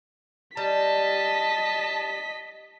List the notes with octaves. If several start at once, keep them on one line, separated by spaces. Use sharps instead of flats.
G3 D#5 A5 B6